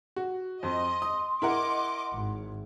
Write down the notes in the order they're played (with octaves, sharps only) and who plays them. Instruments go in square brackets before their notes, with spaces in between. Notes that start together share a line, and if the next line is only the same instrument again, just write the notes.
[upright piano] F#4
[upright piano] F2 [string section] D#5 [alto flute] C6
[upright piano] D#6
[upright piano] E4 A#4 F#5 [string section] D#5 D6
[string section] G#1